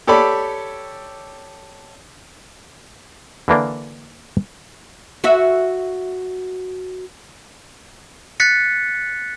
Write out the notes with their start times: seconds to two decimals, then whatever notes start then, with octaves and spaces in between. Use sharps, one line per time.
0.07 G4 A4 C#5 D5 B5
3.48 D3 E3 A#3 D4
5.24 F#4 E5
8.40 F#6 A6 B6 C#7